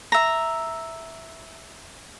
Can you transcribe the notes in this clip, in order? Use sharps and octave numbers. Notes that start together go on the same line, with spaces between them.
E5 A#5